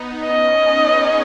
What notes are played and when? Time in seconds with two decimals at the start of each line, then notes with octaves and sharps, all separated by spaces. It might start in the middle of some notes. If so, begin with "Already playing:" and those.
Already playing: B3 D#4
0.25 C#4 D#5
0.55 B3 D#4
0.86 G#4 C#5